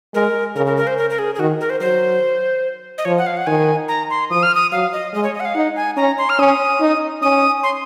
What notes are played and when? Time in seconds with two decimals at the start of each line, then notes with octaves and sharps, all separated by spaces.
0.14 G#3 A#4
0.56 C#3 A#4
0.66 A#4
0.77 A#4
0.87 C5
0.98 A#4
1.10 A#4
1.19 G#4
1.35 G#4
1.39 D#3 F#4
1.61 A#4
1.70 C5
1.80 F#3 C5
2.98 D#5
3.05 F3 C#5
3.18 F#5
3.26 F5
3.37 F#5
3.47 D#3 G#5
3.88 A#5
4.10 C6
4.30 F3 D#6
4.43 F6
4.55 D#6
4.72 F#3 F5
4.93 D#5
5.14 G#3 D#5
5.24 C#5
5.35 D#5
5.40 F#5
5.45 F5
5.55 D#4 F#5
5.76 G#5
5.97 C#4 A#5
6.18 C6
6.29 F6
6.39 C#4 D#6
6.81 D#4
7.22 C#4 D#6
7.63 C6